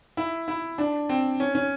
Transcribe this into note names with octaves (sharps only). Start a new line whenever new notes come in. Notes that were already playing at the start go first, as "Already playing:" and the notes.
E4
E4
D4
C4
C#4
C#4